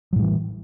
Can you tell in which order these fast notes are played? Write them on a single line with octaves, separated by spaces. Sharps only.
F#3 A2 G3 E3